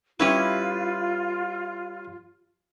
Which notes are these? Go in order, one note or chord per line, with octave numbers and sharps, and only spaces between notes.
G3 C#4 E4 F4 B4